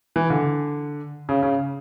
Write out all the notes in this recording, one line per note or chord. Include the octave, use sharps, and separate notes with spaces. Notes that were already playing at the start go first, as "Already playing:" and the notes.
E3
D3
C#3
C#3